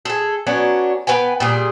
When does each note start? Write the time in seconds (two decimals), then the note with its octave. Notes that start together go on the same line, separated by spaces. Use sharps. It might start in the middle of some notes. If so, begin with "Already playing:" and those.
0.05 G#4 A4
0.47 F#3 B3 C#4 D4
1.07 B3 B4 G5 G#5
1.40 A#2 G3 G#4